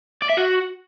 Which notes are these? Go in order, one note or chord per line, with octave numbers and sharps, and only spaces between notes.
D5
E5
F#4